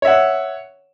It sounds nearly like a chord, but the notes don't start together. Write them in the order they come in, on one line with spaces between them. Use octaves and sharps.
C#5 E5 F#5